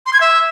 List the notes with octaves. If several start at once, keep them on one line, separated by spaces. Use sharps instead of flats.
C6
G#6
E5